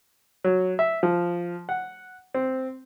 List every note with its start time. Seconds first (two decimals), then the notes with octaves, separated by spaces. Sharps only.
0.44 F#3
0.79 E5
1.03 F3
1.69 F#5
2.34 C4